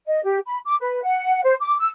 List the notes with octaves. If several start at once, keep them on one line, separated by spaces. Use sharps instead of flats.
D#5
G4
B5
D6
B4
F#5
C5
D6
E6